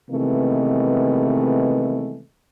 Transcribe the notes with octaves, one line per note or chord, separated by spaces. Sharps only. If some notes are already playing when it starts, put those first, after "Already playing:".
C3 D#3 E3 G#3 A3 B3